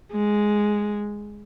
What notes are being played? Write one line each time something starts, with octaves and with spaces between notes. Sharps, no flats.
G#3